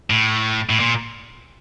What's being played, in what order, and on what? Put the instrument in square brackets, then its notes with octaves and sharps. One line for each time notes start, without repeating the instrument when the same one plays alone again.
[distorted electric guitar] A2
A2
A#2